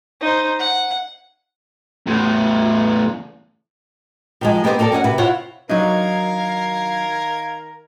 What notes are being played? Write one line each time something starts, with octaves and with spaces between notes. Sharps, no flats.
D#4 C5
F#5
E2 A2
D#3 F3 G#3
B3 C4 D#4 G4 G#4 C5
A#3 C4 A4 A#4 D5
C#4 F#4 D#5 F#5
C3 B4 E5
E4 F4 C5 C#5 E5 F#5
D#3 F#3 D4 D#4 A#4 F5 G#6